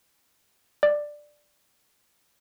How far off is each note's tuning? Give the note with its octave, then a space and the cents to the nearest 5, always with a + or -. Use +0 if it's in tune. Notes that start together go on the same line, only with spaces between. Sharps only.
D5 +10